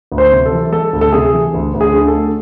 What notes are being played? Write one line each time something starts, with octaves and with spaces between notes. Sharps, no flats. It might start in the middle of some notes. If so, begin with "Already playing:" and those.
D2
C5
C3
A4
E3
G#3 A4
D2
A4
C3 G#4
E3
D2
D2
G#4
D3
A4
A3